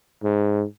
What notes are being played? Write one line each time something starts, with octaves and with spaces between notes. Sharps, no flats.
G#2